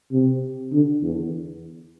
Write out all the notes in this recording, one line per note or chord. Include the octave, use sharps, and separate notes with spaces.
C3
D3
E2